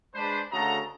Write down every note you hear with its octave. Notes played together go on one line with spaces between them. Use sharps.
G#3 D4 B4 C5
D2 C#3 F#4 A4 D#5 A#5